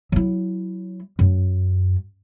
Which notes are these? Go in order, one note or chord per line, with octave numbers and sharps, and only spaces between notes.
F#3 E4
F#2